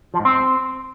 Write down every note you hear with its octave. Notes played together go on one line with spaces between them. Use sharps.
F3
G#2
C4